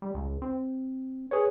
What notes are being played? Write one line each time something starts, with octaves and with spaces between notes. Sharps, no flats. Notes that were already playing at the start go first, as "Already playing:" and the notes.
G3
C#2
C4
G#4 B4 C#5